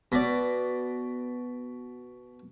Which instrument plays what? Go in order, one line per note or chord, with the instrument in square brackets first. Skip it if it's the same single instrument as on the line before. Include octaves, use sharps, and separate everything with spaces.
[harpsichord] B2 D5